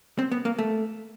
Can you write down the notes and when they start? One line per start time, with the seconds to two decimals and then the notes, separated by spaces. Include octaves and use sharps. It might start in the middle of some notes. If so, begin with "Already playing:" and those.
0.19 C4
0.32 B3
0.45 A#3
0.59 A3